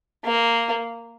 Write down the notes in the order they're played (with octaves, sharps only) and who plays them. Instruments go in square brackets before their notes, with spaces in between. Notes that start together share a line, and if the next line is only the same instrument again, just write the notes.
[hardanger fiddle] A#3